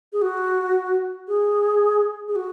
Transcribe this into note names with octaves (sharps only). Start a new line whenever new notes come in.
G#4
F#4
G#4
G#4
F#4